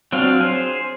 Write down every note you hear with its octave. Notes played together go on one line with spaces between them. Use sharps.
F#3 C4 D4 F4 F5
G#4 C5